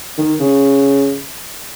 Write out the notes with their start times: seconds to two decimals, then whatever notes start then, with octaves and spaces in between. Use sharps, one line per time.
0.18 D#3
0.40 C#3